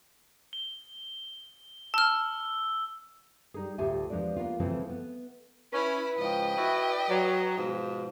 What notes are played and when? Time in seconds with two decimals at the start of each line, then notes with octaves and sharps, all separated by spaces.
0.53 G7
1.94 A5 E6 F6 G7
3.54 G3 D#4 G#4
3.78 D2 A2 F4 G4 E5 G#5
4.10 E2 F3 G#3 D4 D5
4.36 A#3 B3 F4
4.60 C#3 E3 F3 G#3 A3 C4
4.90 B3
5.73 C#4 E4 B4 B5
6.19 G#2 C#3 F3 D#5 G5
6.57 E4 F#4 E5
7.09 F#3
7.57 G#2 B2 F3